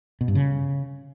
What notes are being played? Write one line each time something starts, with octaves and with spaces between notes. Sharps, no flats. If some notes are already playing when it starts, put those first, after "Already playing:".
B2
G2
C#3